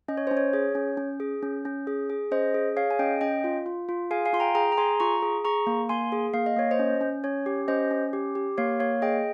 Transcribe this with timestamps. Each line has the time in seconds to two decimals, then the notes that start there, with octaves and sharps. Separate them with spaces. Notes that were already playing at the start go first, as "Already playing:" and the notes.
0.08 C#4 D#5
0.17 C#5
0.27 C#4 C5
0.37 C#5
0.53 G#4 C#5
0.75 C#4
0.97 C#4
1.20 G#4
1.43 C#4
1.65 C#4
1.87 G#4
2.10 G#4
2.31 C#4 C5 D#5
2.54 G#4
2.76 G#4 C#5 F5
2.91 G#5
2.99 C#4 D#5 G5
3.21 C#4 D#5 G5
3.44 F4
3.66 F4
3.89 F4
4.11 G#4 F5 G#5
4.25 F5 G#5
4.33 F4 C6
4.40 G5 A#5
4.55 G#4 G5 A#5
4.72 A#5
4.77 G#4 G#5 C6
5.00 F4 A#5 C#6
5.22 G#4
5.45 G#4 A#5 C#6
5.67 A#3
5.89 A#3 G#5 C6
6.12 G#4
6.34 A#3 F5
6.46 D#5
6.56 A#3 C#5
6.71 C5 D#5
6.79 C#4
7.01 C#4
7.24 C#4 C#5
7.46 G4
7.68 C#4 C5 D#5
7.91 C#4
8.13 G4
8.35 G4
8.58 A#3 C#5 F5
8.80 A#3 C#5 F5
9.02 G#4 D#5 G5